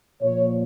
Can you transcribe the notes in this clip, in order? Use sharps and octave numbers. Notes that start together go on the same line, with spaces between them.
A#2 F3 C#5